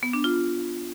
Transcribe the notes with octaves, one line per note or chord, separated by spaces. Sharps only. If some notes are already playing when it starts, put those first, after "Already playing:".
B3
D4
F4